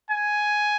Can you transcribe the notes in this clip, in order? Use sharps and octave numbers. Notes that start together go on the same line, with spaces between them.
G#5